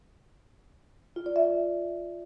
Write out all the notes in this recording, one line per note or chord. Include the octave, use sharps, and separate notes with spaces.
F4
D5
E5